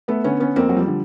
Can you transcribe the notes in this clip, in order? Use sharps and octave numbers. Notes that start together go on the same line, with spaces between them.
A3 B3
D3 B3 C#4
B3 C#4
F2 A#3 C4
F#3
F3 G3
D3